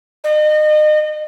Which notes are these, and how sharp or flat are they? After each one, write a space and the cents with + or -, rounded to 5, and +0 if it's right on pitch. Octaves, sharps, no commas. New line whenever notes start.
D#5 -35